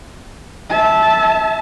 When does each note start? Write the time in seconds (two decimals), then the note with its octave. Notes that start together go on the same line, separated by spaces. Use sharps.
0.69 E5 A5